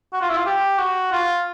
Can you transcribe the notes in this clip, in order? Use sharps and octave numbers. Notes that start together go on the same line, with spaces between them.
F#4
F4
E4
F4
G4
F#4
F4